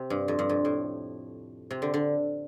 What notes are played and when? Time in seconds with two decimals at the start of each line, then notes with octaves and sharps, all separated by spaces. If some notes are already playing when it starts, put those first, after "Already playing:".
Already playing: C3
0.10 G2
0.28 F2
0.39 G2
0.49 F2
0.65 A2
1.71 C3
1.82 D3
1.94 D3